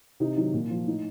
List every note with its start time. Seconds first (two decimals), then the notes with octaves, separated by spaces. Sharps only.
0.20 C3 D#4
0.37 D#3 F#3
0.53 A#2
0.70 F3
0.86 A2 D#4